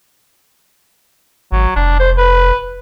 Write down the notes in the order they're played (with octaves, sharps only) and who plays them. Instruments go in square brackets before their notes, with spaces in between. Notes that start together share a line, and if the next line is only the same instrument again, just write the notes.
[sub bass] G#1 [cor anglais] F#3
[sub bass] F1 [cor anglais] D4
[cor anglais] C5
B4